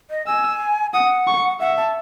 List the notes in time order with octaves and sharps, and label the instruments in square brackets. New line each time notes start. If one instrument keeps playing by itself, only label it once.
[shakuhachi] D#5
[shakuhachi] G#5 [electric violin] E6
[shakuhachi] F#5 [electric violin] D#6
[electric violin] C#6
[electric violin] E5 [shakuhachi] F#5
[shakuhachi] A5